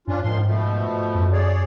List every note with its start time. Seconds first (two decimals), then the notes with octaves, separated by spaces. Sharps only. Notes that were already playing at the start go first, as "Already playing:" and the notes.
0.07 G2 C#4 D4 F4
0.24 G#2 D#3 F3 C6
0.46 B2 F3 A3
1.15 F#2
1.33 G#4 C#5 D5